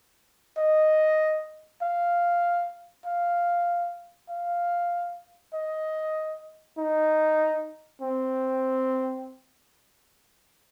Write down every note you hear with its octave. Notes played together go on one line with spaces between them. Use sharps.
D#5
F5
F5
F5
D#5
D#4
C4